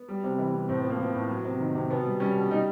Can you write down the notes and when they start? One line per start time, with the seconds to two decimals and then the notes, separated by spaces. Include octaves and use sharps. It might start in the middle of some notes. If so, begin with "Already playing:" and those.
Already playing: B3
0.09 G3
0.24 C3
0.39 E3
0.54 C3
0.69 A2 C4
0.80 F3 B3
0.90 A#3
0.99 F3 B3
1.14 A2
1.29 F#3
1.44 C3
1.60 D#3
1.75 C3
1.90 B2 B3
2.05 G3
2.20 G3 C#4
2.35 B2
2.51 G3 D#4